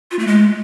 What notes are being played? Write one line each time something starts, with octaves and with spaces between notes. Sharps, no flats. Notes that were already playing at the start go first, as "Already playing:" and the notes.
F4
A3
G#3